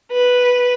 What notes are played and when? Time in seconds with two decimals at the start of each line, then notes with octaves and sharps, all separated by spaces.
0.12 B4